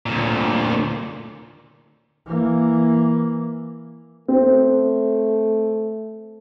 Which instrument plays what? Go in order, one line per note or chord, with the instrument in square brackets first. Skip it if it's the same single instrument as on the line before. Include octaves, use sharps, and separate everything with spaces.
[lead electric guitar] D2 A#2
[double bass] E3 A#3
[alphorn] A3 [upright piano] C4